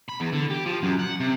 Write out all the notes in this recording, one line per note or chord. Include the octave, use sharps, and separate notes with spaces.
B5
E2
D3
G4
F3
F#2
F#5
C3